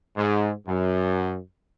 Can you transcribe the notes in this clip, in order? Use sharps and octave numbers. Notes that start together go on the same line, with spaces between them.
G#2
F#2